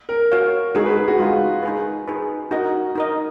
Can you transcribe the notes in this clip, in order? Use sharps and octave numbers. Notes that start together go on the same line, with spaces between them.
A#4
F#4 C#5 F5
G#3 D#4 F#4 G#4
B4
G#4
F#4
G#3 D#4 F4 F#4
D#4 G#4 B4
D#4 G#4 B4
D#4 F#4 A#4 D#5
D#4 A#4 D#5